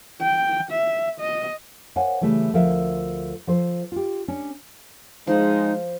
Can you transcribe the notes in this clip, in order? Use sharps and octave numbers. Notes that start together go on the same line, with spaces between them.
G5
E5
D#5
A#4 C5 C#5 F5 F#5 G#5
C#3 E3 G3 A3
D2 F3 A4 A#4 E5 F5
F3 A4 C5
F4 G4
C#4 D4 C#5
F3 G#3 D#4